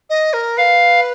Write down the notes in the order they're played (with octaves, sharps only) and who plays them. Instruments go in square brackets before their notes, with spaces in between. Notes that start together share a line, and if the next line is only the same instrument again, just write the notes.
[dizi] D#5
A#4
[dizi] B4 [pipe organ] F5